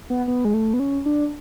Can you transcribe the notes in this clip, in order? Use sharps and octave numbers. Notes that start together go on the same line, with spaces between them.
B3
B3
G#3
A3
B3
C#4
D4